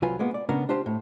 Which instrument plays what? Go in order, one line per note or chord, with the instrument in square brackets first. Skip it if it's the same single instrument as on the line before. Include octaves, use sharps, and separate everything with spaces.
[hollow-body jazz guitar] C2 F#3 F4 B4 G#5
G#3 A#3 B3
D5
C#3 B3 C#4 D4 A#4
D4 F4 G4 C5
A2